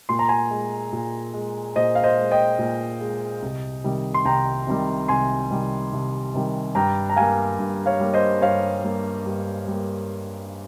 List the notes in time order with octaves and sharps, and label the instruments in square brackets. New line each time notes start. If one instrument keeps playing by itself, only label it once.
[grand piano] A#2 C6
A#5
G#5 C6
G#3
A#2
G#3
A#2 C5 D#5
F5
C5 D#5
G#3
D#5 G5
A#2
G#3
C2
C3 D#3 G3
C6
C2 G5 A#5
C3 D#3 G3
C2 G#5 C6
C3 D#3 G3
C2
C3 D#3 G3
G2 G5 A#5
A#5
G3 A#3 F5 G#5
G2
C#5 F5
G3 A#3
C5 D#5
G2 C#5 F5
G3 A#3
G2
G3 A#3